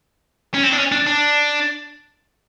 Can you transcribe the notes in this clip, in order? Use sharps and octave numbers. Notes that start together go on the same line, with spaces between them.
C#4
C4
D4
C#4
D4
D4